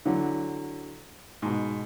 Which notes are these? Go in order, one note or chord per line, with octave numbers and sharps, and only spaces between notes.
D3 E3 F#3
G#2 B2